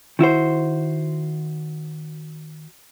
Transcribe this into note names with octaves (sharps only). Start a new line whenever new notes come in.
D#3 E4 F#4 C5